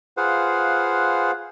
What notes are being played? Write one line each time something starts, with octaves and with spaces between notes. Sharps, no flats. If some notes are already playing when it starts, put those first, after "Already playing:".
F4 G#4 B4 C5 F5 F#5